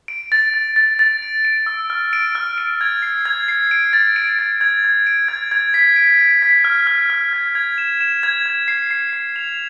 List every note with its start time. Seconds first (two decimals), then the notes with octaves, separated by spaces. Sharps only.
0.08 D7
0.32 A6
0.54 A6
0.76 A6
0.99 A6
1.22 D7
1.45 D7
1.66 E6
1.90 F6
2.13 D7
2.35 F6
2.58 D7
2.81 G#6
3.02 C7
3.25 G#6
3.48 C7
3.71 D7
3.93 A6
4.16 D7
4.39 A6
4.61 G#6
4.84 G#6
5.07 D7
5.28 G#6
5.52 G#6
5.74 B6
5.96 D7
6.19 D7
6.42 B6
6.64 F6
6.87 F6
7.10 F6
7.33 G#6
7.55 G#6
7.78 E7
8.01 E7
8.23 G#6
8.46 G#6
8.68 C7
8.91 C7
9.13 C7
9.36 F7